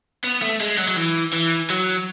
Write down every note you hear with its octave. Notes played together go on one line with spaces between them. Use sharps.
B3
A3
G#3
F#3
F#3
E3
E3
F#3